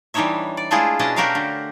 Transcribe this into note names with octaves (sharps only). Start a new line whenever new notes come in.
E3 G3 D4 D#4 C#5 E5
D5
G#3 A3 D4 E4 F4 G#4
B2 C#4 D4 E4 D#5 A5
A3 F#4 G4 A#4 E5 F5
D3